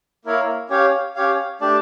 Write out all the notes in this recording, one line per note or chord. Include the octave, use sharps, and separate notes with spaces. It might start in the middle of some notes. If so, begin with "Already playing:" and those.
A#3 E4 A#4 C#5 F5
C#4 G4 C#5 F5
C#4 G4 C#5 F5
A3 D4 G4 D5 A5